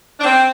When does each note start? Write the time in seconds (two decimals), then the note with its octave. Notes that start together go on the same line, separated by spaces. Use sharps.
0.20 D4
0.25 C4